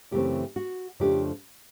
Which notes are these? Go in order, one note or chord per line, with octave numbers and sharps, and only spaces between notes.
F#2 C#3 E3 A3 C4 G4
F#4
F2 C#3 F3 A3 D4 G4